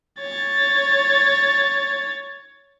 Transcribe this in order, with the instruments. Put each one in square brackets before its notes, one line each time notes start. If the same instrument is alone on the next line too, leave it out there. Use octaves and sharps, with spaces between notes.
[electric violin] C#5 A6